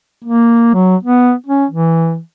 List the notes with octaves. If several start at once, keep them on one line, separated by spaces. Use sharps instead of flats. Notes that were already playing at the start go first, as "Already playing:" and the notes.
A#3
F#3
B3
C#4
E3